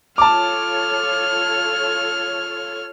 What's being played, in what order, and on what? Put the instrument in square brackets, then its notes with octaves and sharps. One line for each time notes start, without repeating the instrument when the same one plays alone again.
[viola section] F4 A4 C#5 [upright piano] A5 D6 [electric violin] F6